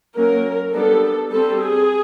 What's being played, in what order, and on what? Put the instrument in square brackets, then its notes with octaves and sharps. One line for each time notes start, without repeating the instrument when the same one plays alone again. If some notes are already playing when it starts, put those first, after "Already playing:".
[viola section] F#3 A#3 C#4 A#4
G3 B3 D4 A4
G3 C4 A4
G#4